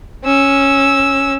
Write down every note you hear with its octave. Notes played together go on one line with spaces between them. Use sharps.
C#4 E6